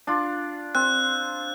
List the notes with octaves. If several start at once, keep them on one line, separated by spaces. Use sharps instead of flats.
D4 F4
C4 F#6